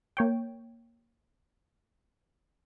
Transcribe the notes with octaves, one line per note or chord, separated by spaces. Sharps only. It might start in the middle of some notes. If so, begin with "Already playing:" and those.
A#3 C#5 G5